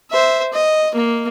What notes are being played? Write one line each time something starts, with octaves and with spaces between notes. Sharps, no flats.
C5 E5
D#5
A#3